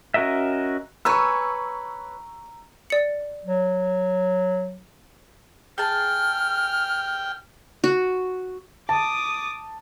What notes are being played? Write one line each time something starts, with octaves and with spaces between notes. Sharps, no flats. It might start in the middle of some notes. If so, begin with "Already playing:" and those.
C#4 F#4 A#4 D#5 E5
B4 C#5 G#5 A#5 C#6 E6
D5 C#7
F#3
G#4 G5 A5 F6
F#4
A5 D6 D#6